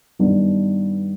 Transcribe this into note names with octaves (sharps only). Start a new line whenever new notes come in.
G2 D#3 B3 D4